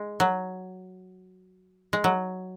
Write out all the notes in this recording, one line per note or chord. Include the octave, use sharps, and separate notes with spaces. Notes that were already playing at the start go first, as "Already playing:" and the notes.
Already playing: G#3
F#3
G#3
F#3